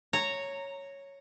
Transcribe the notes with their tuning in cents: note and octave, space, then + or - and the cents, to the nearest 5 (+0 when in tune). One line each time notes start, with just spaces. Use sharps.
C#5 +0 A#5 -10